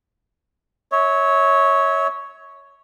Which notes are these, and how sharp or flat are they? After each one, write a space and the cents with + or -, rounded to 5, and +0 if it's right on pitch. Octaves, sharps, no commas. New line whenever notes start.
C#5 +0 E5 -35